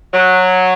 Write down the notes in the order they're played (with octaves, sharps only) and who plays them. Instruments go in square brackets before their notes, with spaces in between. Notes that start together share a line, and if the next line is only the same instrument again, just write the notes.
[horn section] F#3